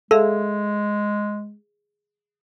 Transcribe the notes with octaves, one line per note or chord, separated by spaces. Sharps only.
G#3 G#4 A4 E5 F5